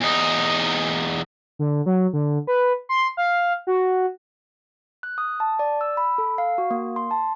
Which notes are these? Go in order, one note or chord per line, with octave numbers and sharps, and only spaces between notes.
E2 D#4
D3
F#3
D3
B4
C6
F5
F#4
F#6
D#6
A5
D5
E6
B5
A4
F5
F#4
A#3
C6
A5